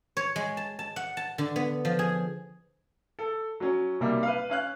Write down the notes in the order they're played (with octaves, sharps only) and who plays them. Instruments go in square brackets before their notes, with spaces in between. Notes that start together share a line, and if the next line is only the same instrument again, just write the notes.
[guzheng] C#5
G#3
A5
A5
F#5
A5
D3
B3
F3
G#4
[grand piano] A4
F#3 C#4
B1 C3 G3 A#3
B4 F5
C#4 F5 F#6